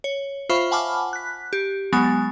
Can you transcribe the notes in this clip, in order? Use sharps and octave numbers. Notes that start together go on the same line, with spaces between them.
C#5
F4 C5 E5 F5 B5 C#6
F#5 G#5 A5 B5 D6 F6
F#6 B6
G4
F#3 G#3 B3 G#5 A6